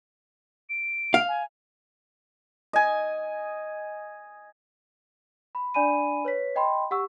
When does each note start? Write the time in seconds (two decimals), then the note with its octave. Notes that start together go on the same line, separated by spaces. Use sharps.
0.69 D7
1.14 F5
1.28 G#5
2.73 D#5 G#5
5.55 B5
5.74 D4 D5 G#5 B5 D#7
6.25 B4 C#5 B6
6.56 D#5 G5 B5 C6
6.91 G4 F#5 C#6 E6